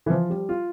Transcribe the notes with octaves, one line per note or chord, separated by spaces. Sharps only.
E3
F3
G3
F4